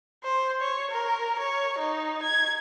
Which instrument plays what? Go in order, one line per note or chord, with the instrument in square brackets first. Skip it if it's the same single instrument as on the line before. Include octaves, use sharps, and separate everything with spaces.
[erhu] C5
C#5
A#4
C#5
D#4
G#6